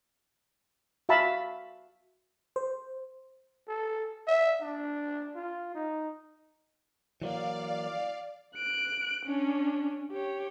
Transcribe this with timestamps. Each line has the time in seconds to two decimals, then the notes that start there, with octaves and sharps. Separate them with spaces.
1.09 F#4 E5 F5 A5 B5
2.56 C5
3.68 A4
4.27 E5
4.62 D4
5.36 F4
5.75 D#4
7.22 E3 F#3 A#3 D5 F5
8.54 F#6 D7
9.25 C#4 D4
10.12 G4 C#5